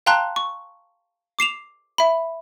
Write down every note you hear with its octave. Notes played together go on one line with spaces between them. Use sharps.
F5 G5 A5 A#5 C6 F#6
C#6
D6 C7 E7 F7
E5 B5